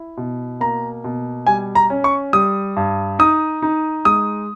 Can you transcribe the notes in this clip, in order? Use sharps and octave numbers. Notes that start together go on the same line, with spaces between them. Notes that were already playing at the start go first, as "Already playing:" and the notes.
Already playing: E4
B2
A#3 A#5
B2
G3 G#5
A#5
C#4
C#6
G3 D#6
G2
D#4 D#6
D#4
G#3 D#6